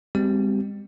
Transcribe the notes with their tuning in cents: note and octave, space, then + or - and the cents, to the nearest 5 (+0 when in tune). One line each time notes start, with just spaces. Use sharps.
G#3 -45 C4 -15 G4 -35